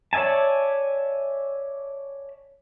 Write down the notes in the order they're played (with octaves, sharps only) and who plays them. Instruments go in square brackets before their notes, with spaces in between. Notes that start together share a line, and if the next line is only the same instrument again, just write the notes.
[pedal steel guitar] C#5 D5 E5 G#5 A5